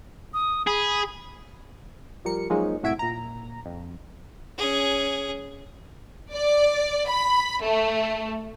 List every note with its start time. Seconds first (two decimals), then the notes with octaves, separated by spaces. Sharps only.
0.34 D#6
0.67 G#4 B5
2.25 F3 G3 A#4 C#7
2.50 F3 F#3 G#3 A#3 C#4 D#4
2.82 C2 A2 F#4 E5 G#6 D7
2.99 A#2 A#5
3.66 F2
4.57 C#4 G#4
6.33 D5
7.08 B5
7.63 A3